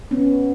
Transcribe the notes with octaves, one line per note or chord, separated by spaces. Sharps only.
B3 C#4